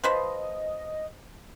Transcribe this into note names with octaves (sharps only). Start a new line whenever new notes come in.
F3 B4 C5 D#5